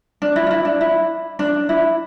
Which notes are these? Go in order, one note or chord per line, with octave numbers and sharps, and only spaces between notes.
D4
E4
F4
E4
D4
E4
D4
E4